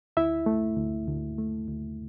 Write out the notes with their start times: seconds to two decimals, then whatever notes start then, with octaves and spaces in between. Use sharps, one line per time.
0.17 D2 E4 E5
0.46 A3
0.77 D2
1.08 D2
1.38 A3
1.67 D2